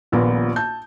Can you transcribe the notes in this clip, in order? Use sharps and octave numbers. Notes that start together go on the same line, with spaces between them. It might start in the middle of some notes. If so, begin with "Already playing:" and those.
D#1 A#1 A#3 B3
A5 G6